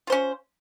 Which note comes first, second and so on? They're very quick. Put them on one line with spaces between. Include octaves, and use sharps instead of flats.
F4 C5 C#4